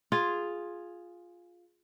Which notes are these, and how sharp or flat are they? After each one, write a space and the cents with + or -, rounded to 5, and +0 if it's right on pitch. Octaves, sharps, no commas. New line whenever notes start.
F4 +5 G#4 +0